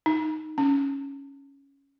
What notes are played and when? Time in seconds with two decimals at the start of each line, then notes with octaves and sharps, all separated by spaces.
0.06 D#4
0.58 C#4